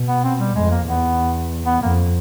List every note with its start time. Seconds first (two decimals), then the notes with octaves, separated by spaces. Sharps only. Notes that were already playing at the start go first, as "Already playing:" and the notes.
Already playing: B2
0.08 B3
0.24 C4
0.40 G3
0.55 F2 G#3
0.71 A#3
0.87 E2 B3
1.66 B3
1.82 F2 A#3